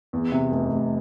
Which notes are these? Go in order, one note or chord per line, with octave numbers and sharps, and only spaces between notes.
E2
C3
F1
F1